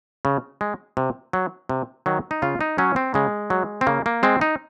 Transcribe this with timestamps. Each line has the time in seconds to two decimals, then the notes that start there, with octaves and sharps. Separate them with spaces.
0.25 C#3
0.61 G#3
0.97 C3
1.33 F#3
1.69 C3
2.06 D#3 F#3
2.31 D#4
2.42 C#3 F4
2.61 D#4
2.78 F#3 C#4
2.96 C4
3.14 C#3 G#3
3.50 F#3
3.81 C4
3.86 C#3 A#3
4.06 A#3
4.23 G#3 C4
4.41 D#4